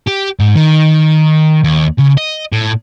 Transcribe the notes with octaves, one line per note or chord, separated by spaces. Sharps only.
G4
G#2
D#3
D#2
C#3
D#5
A2